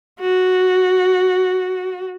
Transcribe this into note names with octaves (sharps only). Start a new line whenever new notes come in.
F#4